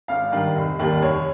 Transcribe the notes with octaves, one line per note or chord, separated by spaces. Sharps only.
G#1 F5
G2 D#3
F1
D#2 D#3 G3
F1 C#5